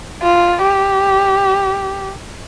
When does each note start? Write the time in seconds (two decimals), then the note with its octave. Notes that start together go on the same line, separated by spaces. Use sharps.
0.22 F4
0.62 G4